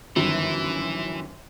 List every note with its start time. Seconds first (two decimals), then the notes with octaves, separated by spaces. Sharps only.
0.16 G1 F#2 D#3 E3